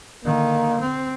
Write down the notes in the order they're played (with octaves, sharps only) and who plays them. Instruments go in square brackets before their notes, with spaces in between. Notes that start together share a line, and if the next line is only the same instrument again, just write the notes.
[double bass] D3 D#3 [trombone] A#3
[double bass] C4